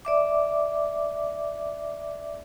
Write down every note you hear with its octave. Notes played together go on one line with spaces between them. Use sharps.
D5 E5 D6